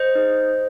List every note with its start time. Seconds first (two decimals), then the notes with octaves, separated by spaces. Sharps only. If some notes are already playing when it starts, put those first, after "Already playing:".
Already playing: C5 D#5
0.15 D#4 G#4